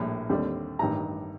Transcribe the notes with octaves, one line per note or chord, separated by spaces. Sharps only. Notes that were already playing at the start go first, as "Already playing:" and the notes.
Already playing: A#1 A2 G3 A#3
D#2 D3 G3 C4
A1 G2 D#3 A#5